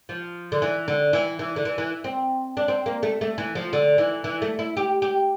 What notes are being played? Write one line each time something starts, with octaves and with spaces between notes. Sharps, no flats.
F3
D3
E3
D3
E3
E3
D3
E3
E3
C4
D4
C4
A#3
A3
A3
E3
F3
D3
E3
E3
A3
E4
G4
G4